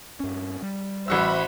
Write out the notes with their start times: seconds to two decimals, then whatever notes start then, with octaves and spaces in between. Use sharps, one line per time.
0.20 G2 C#4
0.62 G3
1.08 A1 F#4 C5 E5 B5 E6